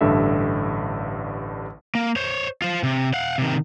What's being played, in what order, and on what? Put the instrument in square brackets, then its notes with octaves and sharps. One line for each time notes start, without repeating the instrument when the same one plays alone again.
[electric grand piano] A1 G2 D3 A4 E5
[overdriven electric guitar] A#3
C5 C#5
F4 C5
C3
F5 F#5
C3 D#3